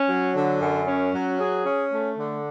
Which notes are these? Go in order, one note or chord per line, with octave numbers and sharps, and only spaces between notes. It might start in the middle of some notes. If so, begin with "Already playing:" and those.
Already playing: C#4
F#3
D3
F#2
C#4
F#3
G#4
C#4
A3
D3